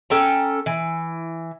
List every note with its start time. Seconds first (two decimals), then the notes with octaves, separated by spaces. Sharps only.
0.10 C#4 A4 G5 A#5
0.66 E3